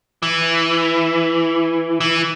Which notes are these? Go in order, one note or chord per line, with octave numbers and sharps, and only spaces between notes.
E3
E3